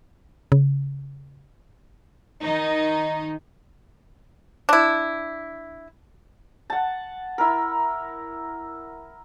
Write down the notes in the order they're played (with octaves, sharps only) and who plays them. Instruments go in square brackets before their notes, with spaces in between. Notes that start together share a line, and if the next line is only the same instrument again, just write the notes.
[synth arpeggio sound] C#3
[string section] D#3 D#4
[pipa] D4 E4
[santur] F#5 A5
E4 A#4